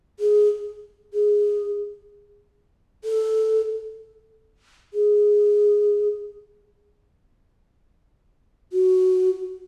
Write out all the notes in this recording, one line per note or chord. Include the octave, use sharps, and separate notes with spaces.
G#4
G#4
A4
G#4
F#4